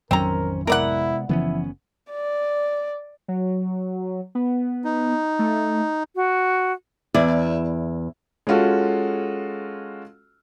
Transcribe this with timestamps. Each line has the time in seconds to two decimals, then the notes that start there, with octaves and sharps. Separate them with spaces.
0.11 A1 F2 D#3 F#3 C4 C#4 A#4 A#5
0.67 C3 G#3 B3 E4 A#4 D5 F#5
1.29 F#1 C#3 E3 F3 B3 C#4 E4
2.11 D5
3.28 F#3
4.35 B3
4.84 D#4
5.39 A3
6.16 F#4
7.14 E2 E4 D5
8.47 G#3 C#4 F4 F#4 A4